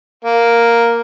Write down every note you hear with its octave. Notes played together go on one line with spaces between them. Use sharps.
A#3